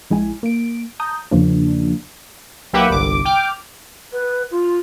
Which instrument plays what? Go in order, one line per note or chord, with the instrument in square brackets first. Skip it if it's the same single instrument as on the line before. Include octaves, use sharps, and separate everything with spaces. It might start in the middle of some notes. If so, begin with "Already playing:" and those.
[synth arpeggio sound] A#1 G#3 E4 G#5
A#3 D7
A5 A#5 D#6 G6
E2 C#3 F3 A#3 D4
[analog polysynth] B1 A#3 G4 B4 E5 F#5
G1 C2 D6
G5 D6 F6
[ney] B4
F4